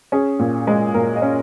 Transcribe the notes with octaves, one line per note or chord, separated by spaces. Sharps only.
C#4 G#4
A#2
G#3
A#2 A#4
D#5
C#4